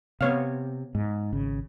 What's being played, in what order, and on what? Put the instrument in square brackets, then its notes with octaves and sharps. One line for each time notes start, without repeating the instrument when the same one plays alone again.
[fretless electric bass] C3 [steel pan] B3 C#5 F5
[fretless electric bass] G#2
G#1 C#3